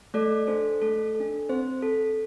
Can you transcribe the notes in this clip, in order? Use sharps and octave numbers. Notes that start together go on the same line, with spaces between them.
A3 A4 D5
D4 A4 C5
A3 A4
A4
D4
C4 C5
A4